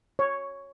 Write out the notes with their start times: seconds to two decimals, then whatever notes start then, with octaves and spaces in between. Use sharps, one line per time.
0.19 C#5